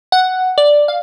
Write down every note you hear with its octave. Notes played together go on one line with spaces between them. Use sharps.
F#5
D5
F5